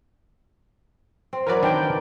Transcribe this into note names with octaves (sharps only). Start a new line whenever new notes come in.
C4
E3 F#3 F#4 A#4 B4 D5
D#3 D4 G5